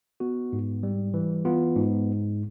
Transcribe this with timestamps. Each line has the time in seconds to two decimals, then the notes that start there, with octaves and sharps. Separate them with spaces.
0.20 B3 F#4
0.53 G#2
0.83 G3
1.14 E3
1.45 B3 F4
1.76 G#2